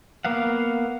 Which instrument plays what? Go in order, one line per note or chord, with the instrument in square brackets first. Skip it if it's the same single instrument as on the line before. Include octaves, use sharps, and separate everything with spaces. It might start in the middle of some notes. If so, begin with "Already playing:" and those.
[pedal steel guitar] A#3 B3 F5 F#5